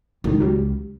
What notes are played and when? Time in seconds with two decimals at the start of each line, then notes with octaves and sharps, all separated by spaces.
0.24 G1 C#2 A2 D#3
0.40 F#3 G3